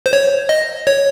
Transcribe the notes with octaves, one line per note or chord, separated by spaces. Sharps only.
C5
C#5
D#5
C#5